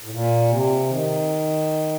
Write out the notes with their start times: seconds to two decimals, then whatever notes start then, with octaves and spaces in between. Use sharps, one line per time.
0.03 A2
0.10 A#2
0.49 C3
0.88 D#3